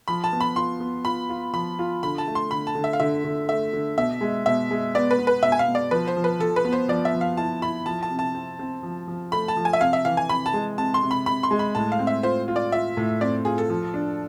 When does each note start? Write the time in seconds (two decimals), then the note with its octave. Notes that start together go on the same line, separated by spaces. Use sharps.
0.08 F3 B5
0.24 A5
0.32 B3
0.41 B5
0.56 F4 C6
0.80 B3
1.05 F4 B5
1.29 F4
1.53 F3 B5
1.79 F4
2.03 D3 B5
2.18 A5
2.27 A3
2.35 C6
2.51 D3 B5
2.67 A5
2.75 D3
2.84 E5
2.93 F5
3.00 D3 E5
3.24 D3
3.49 A3 E5
3.73 D3
3.97 B2 E5
4.21 G#3
4.46 B2 E5
4.71 G#3
4.95 B3 D5
5.11 B4
5.18 B3
5.27 B4
5.43 B2 E5
5.52 G#5
5.59 F5
5.68 B2
5.75 D5
5.91 F3 B4
6.08 C5
6.17 F3
6.24 B4
6.40 F3 A4
6.56 B4
6.65 B3
6.72 C5
6.88 F3 D5
7.05 E5
7.14 F3
7.21 F5
7.37 E4 A5
7.62 E4 B5
7.86 F3 A5
8.03 A5
8.10 C3
8.19 A5
8.35 C4
8.59 C4
8.83 F3
9.08 F3
9.32 A3 B5
9.48 A5
9.57 F3
9.65 G#5
9.73 E5
9.80 C3 F5
9.93 E5
10.05 E3 F5
10.17 G#5
10.29 C3 B5
10.46 A5
10.53 G#3
10.78 C3 A5
10.94 C6
11.03 C3
11.11 B5
11.26 C3 B5
11.43 C6
11.51 G#3
11.59 B5
11.75 A2 A5
11.92 F5
11.99 C4
12.07 E5
12.23 F4 C5
12.48 F4
12.56 D5
12.72 F4 E5
12.97 A2
13.21 C4 D5
13.45 F4 G#4
13.58 A4
13.70 F3
13.94 D4